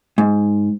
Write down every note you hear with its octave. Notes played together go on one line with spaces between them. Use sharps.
G#2